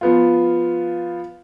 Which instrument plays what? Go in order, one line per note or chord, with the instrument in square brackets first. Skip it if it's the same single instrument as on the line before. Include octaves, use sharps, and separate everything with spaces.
[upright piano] F3 B3 F4